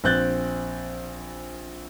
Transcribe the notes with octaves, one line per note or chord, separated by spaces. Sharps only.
A#1 C4 F#6 G6 A6